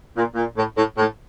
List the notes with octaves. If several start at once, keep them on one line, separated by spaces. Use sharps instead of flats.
A#2
A#2
A2
A2
A2